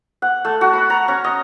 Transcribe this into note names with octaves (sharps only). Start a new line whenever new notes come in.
F#5
A3
F#4
B5
A#5
C#4
D#5